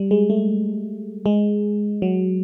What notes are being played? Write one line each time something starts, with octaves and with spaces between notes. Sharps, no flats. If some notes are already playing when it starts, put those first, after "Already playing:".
Already playing: G3
G#3
A3
G#3
F#3